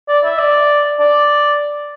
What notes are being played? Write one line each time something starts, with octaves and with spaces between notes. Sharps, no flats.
D5
E5
D5
D5